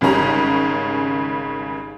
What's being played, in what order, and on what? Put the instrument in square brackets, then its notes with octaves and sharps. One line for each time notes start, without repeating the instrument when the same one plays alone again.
[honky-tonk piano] G#1 C#3 G3 C#4 A#5